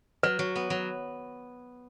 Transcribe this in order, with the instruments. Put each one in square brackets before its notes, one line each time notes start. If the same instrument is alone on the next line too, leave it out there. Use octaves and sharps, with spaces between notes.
[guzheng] F#3 [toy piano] B4
[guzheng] F#3
B3
F#3